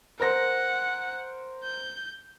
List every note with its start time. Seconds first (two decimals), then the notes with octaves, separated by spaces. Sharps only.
0.20 A#4 C5 F#5 A#6
1.64 G6